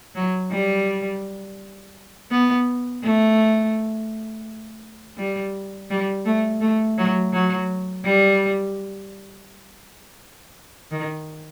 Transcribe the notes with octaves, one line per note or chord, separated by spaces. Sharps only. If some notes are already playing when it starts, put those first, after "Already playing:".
F#3
G3
B3
A3
G3
G3
A3
A3
F#3
F#3
G3
D#3